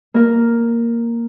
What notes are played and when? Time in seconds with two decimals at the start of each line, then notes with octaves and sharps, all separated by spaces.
0.14 A#3 A#4